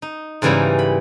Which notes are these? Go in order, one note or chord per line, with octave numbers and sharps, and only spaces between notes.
D#4
G#2 C#3 E3 G3 A#3 E4
B5